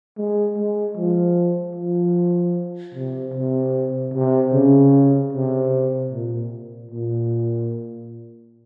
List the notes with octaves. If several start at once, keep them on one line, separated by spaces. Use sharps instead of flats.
G#3
G#3
F3
F3
C3
C3
C3
C#3
C3
A#2
A#2